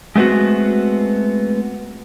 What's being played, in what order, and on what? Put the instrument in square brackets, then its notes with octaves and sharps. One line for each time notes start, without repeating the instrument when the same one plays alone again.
[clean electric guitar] G#3 A3 B3 C4 F#4